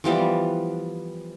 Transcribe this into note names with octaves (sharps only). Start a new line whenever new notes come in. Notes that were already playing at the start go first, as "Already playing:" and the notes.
E3 F3 G3 B3